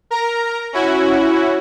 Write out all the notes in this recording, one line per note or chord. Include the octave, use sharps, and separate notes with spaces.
A#4 A#5
C#4 E4 F#4